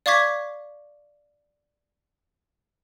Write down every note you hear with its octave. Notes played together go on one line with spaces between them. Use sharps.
D5 F5 C#6 D6 G#6 B6